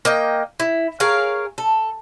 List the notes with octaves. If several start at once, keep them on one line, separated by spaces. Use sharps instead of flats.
A#3 D#5 G5
E4
G#4 A#4 C#5 F5
A4